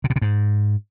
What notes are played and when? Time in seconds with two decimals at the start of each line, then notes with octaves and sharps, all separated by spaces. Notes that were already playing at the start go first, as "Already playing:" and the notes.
0.04 C3
0.10 B2
0.16 C3
0.22 G#2